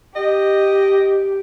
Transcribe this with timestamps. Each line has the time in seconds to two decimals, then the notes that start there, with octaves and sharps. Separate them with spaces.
0.16 G4 D#5